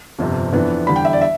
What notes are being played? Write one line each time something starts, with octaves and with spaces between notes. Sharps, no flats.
G1 F2 C3
F2 E3 B3 D4
E2 D3 G3 B5
G5
E5
D5
E5